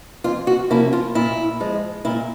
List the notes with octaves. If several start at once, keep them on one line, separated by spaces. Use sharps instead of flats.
F2 F4
F#4
C3 F3 A#3 C#4 E4
F4
A#2 E4
F3 G#3
A#2 E4